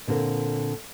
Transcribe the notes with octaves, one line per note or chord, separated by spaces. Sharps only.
A#2 D3 C4 A#4